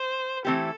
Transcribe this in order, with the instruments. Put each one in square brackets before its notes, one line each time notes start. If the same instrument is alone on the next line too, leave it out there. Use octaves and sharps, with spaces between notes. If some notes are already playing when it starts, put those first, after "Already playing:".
Already playing: [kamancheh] C5
[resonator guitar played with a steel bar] E3 A3 C4 E4 G4 [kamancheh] A4